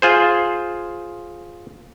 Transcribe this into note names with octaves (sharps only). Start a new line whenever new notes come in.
F4 G#4 C5